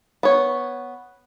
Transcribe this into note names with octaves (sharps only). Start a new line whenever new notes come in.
B3 C#5